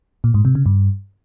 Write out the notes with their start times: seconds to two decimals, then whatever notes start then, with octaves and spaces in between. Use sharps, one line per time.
0.24 A#2
0.34 G#2
0.45 C3
0.55 C#3
0.66 G2